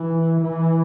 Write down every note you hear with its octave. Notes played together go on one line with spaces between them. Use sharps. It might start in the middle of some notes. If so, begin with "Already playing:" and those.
Already playing: E3
E3